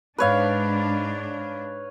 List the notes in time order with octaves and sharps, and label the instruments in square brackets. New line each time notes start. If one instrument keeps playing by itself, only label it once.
[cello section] G#2 D4 [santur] B4 C#5 F5